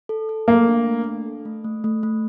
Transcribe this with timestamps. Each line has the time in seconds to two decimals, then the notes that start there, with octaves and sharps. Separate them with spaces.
0.09 A4
0.29 A4
0.48 A3 A#3
0.68 D4
0.87 A3
1.06 D4
1.25 A4
1.45 A3
1.64 A3
1.84 A3
2.03 A3